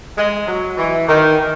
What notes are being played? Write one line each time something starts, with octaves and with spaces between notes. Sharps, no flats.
G#3
F#3
E3
D#3